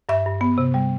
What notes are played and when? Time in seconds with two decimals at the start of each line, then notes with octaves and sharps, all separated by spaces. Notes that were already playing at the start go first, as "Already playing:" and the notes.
0.09 G2 E5
0.26 G2
0.41 B3
0.58 C3
0.74 G3